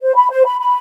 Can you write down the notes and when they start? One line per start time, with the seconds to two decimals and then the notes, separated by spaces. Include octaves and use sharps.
0.02 C5
0.15 B5
0.30 C5
0.45 B5
0.59 B5